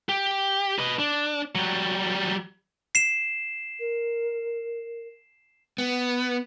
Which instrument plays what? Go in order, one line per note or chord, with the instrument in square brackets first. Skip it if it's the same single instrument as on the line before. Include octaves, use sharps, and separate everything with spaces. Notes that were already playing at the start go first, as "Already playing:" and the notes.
[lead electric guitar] G4
B4 D#5
D4
F#3 G3
[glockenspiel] C7 E7
[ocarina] A#4
[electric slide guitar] B3